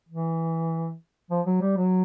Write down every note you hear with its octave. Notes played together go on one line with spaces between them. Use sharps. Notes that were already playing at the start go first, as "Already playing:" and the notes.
E3
F3
F#3
G3
F#3